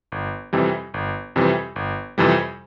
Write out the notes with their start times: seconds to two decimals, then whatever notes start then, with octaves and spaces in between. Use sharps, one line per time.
0.12 G1
0.53 F2 C3 E3 G3
0.94 G1
1.36 F2 C3 E3 G3
1.76 G1
2.18 F2 C3 E3 G3